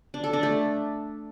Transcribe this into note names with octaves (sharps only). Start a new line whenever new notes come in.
D4
A4
D4
A3